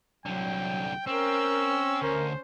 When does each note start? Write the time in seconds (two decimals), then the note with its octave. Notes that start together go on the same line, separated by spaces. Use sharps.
0.26 C2 D3 F#3 G5
1.07 C4 C#4 A#4 E6
2.02 D2 A#4 C5